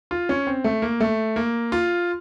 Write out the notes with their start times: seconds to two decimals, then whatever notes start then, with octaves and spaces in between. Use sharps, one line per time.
0.11 F4
0.29 C#4
0.47 C4
0.64 A3
0.82 A#3
1.00 A3
1.36 A#3
1.72 F4